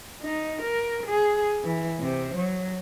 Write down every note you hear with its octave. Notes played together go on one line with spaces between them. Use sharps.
D#4
A#4
G#4
E3
C3 C5
F#3